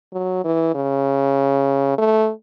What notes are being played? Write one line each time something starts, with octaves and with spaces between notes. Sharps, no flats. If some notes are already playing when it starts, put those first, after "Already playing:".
F#3
E3
C#3
A3